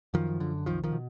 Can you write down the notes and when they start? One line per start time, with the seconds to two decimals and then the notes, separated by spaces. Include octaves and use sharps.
0.14 F#2 D#3 F3
0.40 D3
0.66 C2 D#3 F3
0.84 D#3 F3
0.92 B2